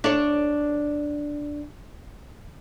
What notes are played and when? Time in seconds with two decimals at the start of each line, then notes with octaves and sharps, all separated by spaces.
0.04 D4 A4 C#5